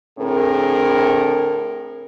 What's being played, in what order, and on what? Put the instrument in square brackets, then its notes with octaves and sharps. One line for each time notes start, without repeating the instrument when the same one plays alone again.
[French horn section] A2 D3 C4 G#4 A#4